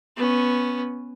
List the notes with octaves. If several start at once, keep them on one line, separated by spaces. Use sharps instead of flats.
B3 C#4